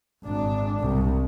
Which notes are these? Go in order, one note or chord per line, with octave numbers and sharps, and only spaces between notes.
G#1 D4
C2